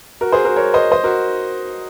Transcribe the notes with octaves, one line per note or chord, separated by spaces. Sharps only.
F#4 A#4
G#4 C5
F#4 A#4
A#4 C#5
C5 D#5
C5 D#5
F#4 A#4